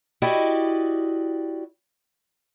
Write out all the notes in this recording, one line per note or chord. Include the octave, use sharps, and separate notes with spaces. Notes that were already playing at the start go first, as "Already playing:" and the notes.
E4 F#4 G4 D5 D#5